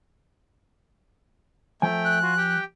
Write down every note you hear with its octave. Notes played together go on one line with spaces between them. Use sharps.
F3 A3 G5 G#5
F#6
F4 F#4
G4 G5